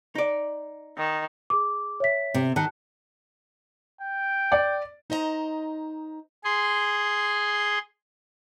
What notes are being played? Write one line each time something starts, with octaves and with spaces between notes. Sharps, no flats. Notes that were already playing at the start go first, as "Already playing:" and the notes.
D#4 D5
D#3
G#4 D6
C#5 E5 B6
C3
D#3 A5 F#6 C#7
G5
D5
D#4 C5 D#5 F5 A#5
G#4 C6